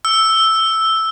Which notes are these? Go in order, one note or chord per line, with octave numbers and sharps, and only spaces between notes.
E6